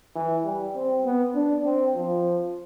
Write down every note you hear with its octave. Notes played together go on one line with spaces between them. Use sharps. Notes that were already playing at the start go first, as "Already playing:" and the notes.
E3
G3
C4
B3
D4
C4
F3